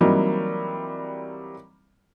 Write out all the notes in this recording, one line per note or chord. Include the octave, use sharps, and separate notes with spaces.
E3 F#3 G3 A#3 C4 D#4